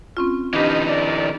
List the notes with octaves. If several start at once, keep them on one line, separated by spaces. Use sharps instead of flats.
C4 C#4 F4
E3 F3 B3 D4 D#4 G4 D#5
A3 A#4 D5